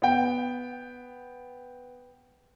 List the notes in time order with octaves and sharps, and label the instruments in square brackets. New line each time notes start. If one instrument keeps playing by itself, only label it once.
[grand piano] B3 G5